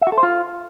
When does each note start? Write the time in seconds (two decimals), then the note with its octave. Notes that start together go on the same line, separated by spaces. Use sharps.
0.01 E5
0.07 F#4
0.12 A4
0.18 C5
0.23 F4